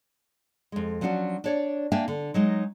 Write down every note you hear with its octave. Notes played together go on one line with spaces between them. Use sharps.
F2 G#3
F3 F#3 C#4 D4 F#4
D4 C#5 D5
A#3 D4 E5 G5 G#5
D3
F#3 G#3 D#4